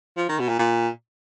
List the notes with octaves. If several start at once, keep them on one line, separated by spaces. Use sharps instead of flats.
F3
D#3
B2
A#2
A#2